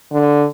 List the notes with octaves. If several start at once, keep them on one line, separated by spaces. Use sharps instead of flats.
D3